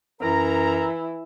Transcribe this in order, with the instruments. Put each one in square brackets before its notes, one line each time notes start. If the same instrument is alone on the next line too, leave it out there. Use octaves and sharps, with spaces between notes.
[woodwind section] F#2 A#4 A#5 [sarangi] E3